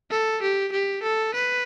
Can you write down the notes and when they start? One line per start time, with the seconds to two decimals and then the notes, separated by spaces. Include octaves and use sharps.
0.11 A4
0.42 G4
0.72 G4
1.03 A4
1.35 B4